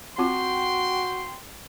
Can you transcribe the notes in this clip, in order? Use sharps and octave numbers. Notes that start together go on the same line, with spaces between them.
C4 F4 F#4 G5 C6